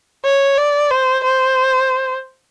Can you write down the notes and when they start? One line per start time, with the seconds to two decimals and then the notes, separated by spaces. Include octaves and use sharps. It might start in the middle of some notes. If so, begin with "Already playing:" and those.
0.24 C#5
0.58 D5
0.91 C5
1.24 C5